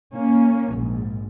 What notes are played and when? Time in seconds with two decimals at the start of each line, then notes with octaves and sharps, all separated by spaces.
0.14 A#3 C#4
0.75 A#1 G#2